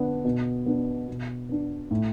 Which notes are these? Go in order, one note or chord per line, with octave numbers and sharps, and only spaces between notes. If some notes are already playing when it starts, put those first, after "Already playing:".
Already playing: D3 B3 D4
B2
B3 D4
B2
B3 D4
A2